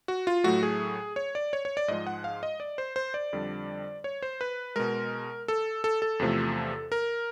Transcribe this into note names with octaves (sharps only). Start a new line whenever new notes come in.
F#4
F4
A2 F#3 A3 F#4
G#4
C#5
D5
C#5
C#5
D5
G#2 F3 G#3 D#5
F#5
F5
D#5
D5
C5
C5
D5
F2 D3 G3
C#5
C5
B4
B2 G#3 A#4
A4
A4
A4
E2 C3 F3 A3
A#4